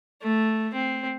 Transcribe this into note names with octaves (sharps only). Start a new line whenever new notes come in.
A3
C4